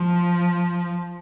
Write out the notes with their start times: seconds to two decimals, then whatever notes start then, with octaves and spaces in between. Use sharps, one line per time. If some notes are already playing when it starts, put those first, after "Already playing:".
Already playing: F3